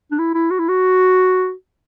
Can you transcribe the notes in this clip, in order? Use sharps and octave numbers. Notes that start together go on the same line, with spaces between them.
D4
E4
E4
F#4
E4
F#4